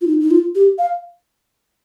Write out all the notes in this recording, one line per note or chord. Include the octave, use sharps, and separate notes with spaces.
F4
D#4
D#4
F4
G4
F5